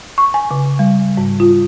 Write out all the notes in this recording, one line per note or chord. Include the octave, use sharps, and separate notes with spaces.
C#6
G#5
C#3
G3
G#2
F4